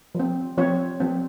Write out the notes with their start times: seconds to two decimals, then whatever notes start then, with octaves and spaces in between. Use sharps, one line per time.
0.15 F3 C4
0.58 F3 C4 C#5
1.00 F3 C4